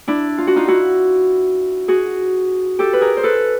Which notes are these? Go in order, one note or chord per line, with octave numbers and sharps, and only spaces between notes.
D4 E4
F4
F#4
D#4 F4
E4 F#4
F#4 G#4
G4 A4
B4
G#4 A#4
C5
A4 B4